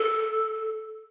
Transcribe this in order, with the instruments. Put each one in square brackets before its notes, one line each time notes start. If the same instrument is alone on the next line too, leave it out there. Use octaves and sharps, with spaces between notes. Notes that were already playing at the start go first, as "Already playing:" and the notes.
Already playing: [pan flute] A4